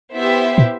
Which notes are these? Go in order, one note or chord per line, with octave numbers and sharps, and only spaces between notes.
B3 E4 G4 C5 E5
A#2